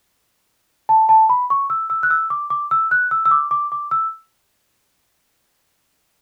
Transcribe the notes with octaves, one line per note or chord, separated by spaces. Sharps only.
A5
A5
B5
C#6
E6
E6
F#6
E6
D6
D6
E6
F#6
E6
E6
D6
D6
D6
E6